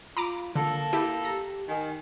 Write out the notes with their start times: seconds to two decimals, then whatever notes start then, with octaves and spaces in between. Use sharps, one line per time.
0.17 F4 A#5 B5 D6
0.56 D3 A#3 A4 A5
0.93 E4 G4
1.24 G4 A#5
1.68 D#3 G#5